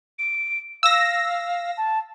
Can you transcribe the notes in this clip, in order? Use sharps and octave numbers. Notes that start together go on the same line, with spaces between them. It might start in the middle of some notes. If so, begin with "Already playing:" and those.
D7
F5 E6 A#6
A5